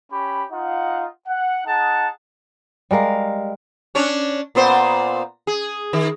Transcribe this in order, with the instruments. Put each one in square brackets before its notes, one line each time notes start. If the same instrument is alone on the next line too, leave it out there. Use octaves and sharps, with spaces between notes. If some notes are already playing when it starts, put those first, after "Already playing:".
[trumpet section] C#4 G4 B5
D#4 F4 F5 F#5
F#5
D#4 G#4 F#5 A5
[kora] G3 G#3 A#4 F5
[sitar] C#4 D4 C#5
A#2 B3 C5
G#4
D#3